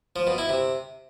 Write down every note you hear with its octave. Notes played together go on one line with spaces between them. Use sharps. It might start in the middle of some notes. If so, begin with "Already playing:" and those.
F3
B2
E4
C3